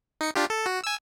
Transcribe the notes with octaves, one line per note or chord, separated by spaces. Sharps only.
D#4 C#7
D4 F4 G4
A4
F#4
G#5 E6